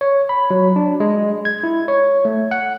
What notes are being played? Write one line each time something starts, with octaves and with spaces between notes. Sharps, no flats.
C#5
B5
F#3
D4
G#3
G#6
E4
C#5
A3
F#5